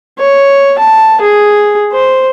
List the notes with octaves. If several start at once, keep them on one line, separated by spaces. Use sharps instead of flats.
C#5
A5
G#4
C5